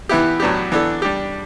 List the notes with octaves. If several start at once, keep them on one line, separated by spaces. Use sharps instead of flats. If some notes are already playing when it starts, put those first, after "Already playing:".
E3 B3 E4 G4
A2 F#3 B3 D4 G4
E3 B3 D4 A4
G3 D4 G4